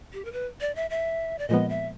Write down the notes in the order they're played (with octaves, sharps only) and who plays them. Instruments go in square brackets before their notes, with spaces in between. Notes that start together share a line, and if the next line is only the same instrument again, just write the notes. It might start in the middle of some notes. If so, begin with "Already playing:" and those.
[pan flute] G4
A#4
B4
D5
E5
E5
D5
[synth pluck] A#2 F3 G#3 B3 [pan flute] D#5
[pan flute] E5